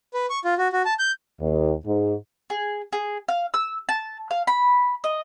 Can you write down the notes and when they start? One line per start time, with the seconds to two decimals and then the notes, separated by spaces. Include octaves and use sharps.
0.14 B4
0.30 C#6
0.45 F4
0.58 F#4
0.72 F#4
0.85 A5
0.99 G6
1.39 D#2
1.85 G#2
2.50 G#4
2.92 G#4
3.28 F5
3.54 E6
3.89 A5
4.31 F5
4.47 B5
5.04 D#5